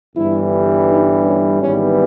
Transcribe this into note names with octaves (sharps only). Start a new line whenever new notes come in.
G1 G2 E3 G3 E4
D#4
C#4
G#1 G#2 E3 G3 B3 C#4